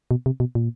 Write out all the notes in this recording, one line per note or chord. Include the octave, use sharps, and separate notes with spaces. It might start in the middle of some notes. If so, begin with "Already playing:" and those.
B2
C3
B2
A#2